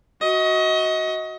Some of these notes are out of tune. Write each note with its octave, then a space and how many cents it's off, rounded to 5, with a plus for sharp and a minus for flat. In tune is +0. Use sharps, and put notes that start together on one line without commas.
F#4 +0 D#5 +30